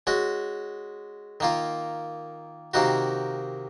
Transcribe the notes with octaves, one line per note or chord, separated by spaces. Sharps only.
G#3 C#4 F#4
D#3 A#3 F4
C3 D#3 A#3 D#4 F#4